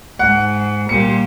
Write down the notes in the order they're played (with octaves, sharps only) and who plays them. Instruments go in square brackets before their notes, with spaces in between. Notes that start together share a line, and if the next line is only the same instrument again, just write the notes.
[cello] G#2 [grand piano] F#5
[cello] A#2 G3 [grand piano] C#7